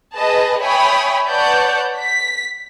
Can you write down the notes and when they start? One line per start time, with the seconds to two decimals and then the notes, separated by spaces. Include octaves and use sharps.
0.16 G#4 B4 D#5 A5
0.63 C#5 E5 G5 G#5 B5 D#6
1.29 B4 C#5 D5 F#5 A5 G6
2.00 B6